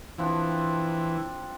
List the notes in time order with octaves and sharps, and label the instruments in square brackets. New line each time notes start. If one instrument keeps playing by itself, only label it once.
[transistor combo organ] E3 [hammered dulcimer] F3 C4 D4